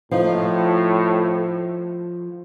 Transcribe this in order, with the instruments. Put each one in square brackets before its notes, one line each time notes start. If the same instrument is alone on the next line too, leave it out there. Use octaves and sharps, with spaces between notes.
[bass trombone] A2 [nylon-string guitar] F3 D#4 F4